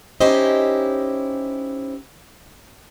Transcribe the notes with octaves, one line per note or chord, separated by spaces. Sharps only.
C#4 D#4 E4 G4 C5 D#5